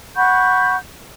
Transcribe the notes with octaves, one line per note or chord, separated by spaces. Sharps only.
F#5 B5 C#6 G6